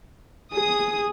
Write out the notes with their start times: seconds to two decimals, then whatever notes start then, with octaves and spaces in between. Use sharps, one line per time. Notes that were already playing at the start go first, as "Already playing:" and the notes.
0.53 G#4 D#6